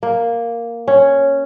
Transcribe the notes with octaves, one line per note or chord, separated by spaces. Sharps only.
A#3
C#4